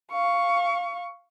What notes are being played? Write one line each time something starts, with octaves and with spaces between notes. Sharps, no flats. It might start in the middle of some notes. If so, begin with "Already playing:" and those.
F5 C#6